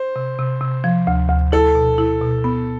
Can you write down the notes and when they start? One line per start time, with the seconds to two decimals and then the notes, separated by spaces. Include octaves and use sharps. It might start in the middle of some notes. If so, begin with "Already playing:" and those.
Already playing: C5
0.16 C3
0.39 C3
0.61 C3
0.84 F3
1.07 D2
1.30 D2
1.52 E4 A4
1.75 B2
1.98 E4
2.21 B2
2.44 B3